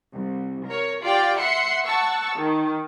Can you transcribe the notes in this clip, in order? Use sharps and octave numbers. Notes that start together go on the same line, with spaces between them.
C2
A#4 C#5
F4 G4 D5 F5 G5
E5 F#5 C6 C7 C#7
F#5 A5 C#6 E6
D#3